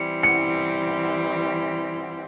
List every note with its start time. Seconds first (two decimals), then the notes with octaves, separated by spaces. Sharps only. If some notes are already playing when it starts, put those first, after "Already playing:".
Already playing: E3 G3 C4 C#7
0.23 C#7